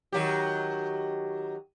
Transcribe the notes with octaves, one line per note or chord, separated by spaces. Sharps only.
D#3 F#3 G4